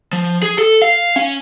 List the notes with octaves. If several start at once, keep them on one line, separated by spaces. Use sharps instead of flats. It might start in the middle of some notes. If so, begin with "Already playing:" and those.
F3
G#4
A4
F5
C#4